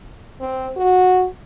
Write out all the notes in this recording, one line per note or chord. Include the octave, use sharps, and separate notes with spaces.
C4
F#4